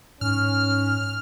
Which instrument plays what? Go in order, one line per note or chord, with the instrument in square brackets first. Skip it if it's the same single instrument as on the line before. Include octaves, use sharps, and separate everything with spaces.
[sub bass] G#2 [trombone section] C#4 [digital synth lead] F6